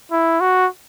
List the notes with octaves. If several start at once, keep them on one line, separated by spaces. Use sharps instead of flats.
E4
F#4